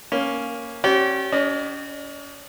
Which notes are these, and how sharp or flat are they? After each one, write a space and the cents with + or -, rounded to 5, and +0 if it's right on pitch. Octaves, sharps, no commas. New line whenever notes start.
A#3 +0 C#4 +0
C#4 -30 G4 -40 D5 -40
C#4 +35 D#5 -35